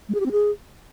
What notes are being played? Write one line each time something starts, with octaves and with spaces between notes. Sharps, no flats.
G#3
G#4
G4
C4
G#4